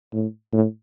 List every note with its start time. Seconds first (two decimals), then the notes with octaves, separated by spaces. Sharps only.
0.13 A2
0.53 A2